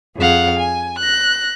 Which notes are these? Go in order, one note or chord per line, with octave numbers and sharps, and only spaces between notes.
F2 G#4 F5 F#5
G#5
F#6 A#6